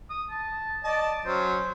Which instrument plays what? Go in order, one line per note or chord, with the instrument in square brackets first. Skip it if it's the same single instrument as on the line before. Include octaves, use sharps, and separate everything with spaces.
[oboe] D#6
A5
[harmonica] D5 A5 [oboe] D#5
[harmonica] F#3 C#4 [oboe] C5